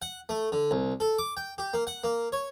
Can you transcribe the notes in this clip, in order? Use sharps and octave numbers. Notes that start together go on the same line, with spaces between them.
F#5
A3
D3
C2
A4
D6
G5
G4
A#3
F#5
A#3
C#5